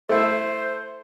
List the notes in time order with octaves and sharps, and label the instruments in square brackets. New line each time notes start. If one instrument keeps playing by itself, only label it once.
[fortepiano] A3 E4 [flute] C5